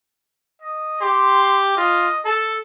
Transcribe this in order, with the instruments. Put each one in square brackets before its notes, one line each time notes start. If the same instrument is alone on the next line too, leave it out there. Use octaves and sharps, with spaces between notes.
[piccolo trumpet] D#5
[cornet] G4 [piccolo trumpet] C6
[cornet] F4 [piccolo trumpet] D#5
[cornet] A4 [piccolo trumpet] A5